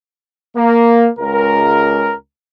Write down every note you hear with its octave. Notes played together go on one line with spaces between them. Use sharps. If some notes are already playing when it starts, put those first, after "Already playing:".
A#3
C#2 A#4